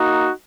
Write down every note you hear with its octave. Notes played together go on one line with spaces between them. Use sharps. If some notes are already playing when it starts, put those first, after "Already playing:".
Already playing: A#3 D#4 F#4